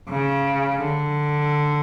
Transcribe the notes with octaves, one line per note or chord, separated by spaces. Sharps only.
C#3
D3